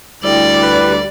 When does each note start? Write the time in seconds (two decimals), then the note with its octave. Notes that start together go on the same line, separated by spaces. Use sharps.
0.23 D2 G3 E4 D5 G5
0.62 B4